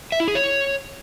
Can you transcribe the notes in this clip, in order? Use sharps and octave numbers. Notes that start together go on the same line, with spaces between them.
E5
E4
G#4
C#5